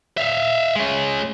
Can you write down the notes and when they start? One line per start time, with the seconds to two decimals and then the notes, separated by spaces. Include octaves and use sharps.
0.17 E5 F5
0.76 G#3 C#4